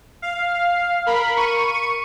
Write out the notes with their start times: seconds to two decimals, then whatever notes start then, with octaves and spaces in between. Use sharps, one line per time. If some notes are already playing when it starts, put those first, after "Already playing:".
0.22 F5
1.06 A#4 B5
1.37 C#6 D#7